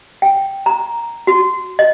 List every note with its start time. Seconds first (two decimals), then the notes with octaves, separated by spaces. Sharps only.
0.22 G5
0.66 A#5
1.27 F#4
1.79 D#5